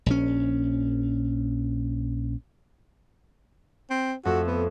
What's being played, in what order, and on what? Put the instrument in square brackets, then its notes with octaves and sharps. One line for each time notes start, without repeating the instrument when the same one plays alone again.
[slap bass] A#1 C#4
[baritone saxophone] C4
[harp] F2 A3 E6 [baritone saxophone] F#4
[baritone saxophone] B3